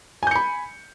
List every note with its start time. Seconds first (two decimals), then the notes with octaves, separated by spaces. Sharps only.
0.23 G#5
0.27 G6
0.31 C#7
0.35 B5